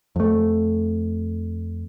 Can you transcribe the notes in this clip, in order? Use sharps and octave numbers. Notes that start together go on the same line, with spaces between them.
F2 A3